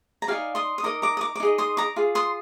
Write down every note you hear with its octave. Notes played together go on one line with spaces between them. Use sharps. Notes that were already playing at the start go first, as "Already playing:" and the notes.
A#5
D#4 G4 D5 F5 G#5
C6 D#6
D#6
D#4 A#4 D#5 A#5 D6
A#5 D6
D#6
A#5 D6
D6
D#4 G#4 D#5
C6 D#6
A#5 D6
F4 G#4
C6 D#6